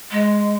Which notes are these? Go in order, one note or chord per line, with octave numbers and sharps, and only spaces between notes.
G#3